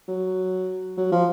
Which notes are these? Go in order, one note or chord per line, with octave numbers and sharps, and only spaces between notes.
F#3
F#3
F3